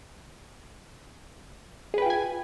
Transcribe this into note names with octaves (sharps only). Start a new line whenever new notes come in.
F4 G#4 B4 G5 G#5